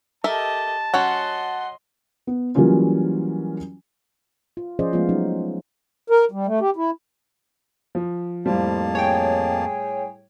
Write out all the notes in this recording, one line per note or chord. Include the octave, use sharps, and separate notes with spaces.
G4 A4 A#4 D#5 E5 A5
F#3 C#4 F#4 D#5 F#5 C6
B3
E3 F#3 G3 A#3 C#4 F4
F4
F3 C#4 G#4 C5 D5 D#5
F3 G#3 A3 B3 F4
F#3 C#4 D#4
A#4
G3
A3
G4
E4
F3
F2 A2 F3 G3 A#3 A5
G#4 C#5 G5